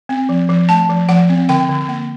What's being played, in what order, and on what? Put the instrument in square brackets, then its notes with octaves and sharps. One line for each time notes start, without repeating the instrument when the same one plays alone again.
[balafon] C4
F3
F3
A3 A5
F3
F3 F#5
C4
D3 G5
D3
A#3